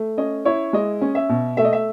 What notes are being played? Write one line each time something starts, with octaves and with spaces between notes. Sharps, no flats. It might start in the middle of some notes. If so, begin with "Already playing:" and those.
Already playing: A3
C#4 D#5
E4 C#5
G#3 D#5
C#4
E5
B2
A3 E5
D#5
E5